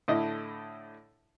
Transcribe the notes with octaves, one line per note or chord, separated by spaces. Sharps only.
A2 D3 E4 D#5